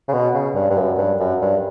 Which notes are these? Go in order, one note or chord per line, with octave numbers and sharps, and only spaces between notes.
C#3
B2
C#3
G2
G2
F#2
G2
F#2
G2